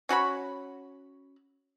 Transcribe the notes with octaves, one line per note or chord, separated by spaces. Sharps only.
C#4 F#4 C#5 B5